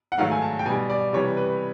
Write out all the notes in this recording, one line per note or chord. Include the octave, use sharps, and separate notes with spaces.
F#5
G#2 D#3 F#3 A3 F5
G#5
A5
G5
B2 G3 G#5
D5
C3 E3 G3 C#5
B4